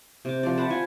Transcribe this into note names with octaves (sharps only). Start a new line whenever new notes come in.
C3 D6
F3 C4 D5
C5 F#5 A5 B5
F4 G#5